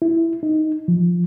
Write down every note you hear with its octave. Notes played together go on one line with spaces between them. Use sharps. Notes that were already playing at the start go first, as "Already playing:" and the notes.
E4
D#4
F3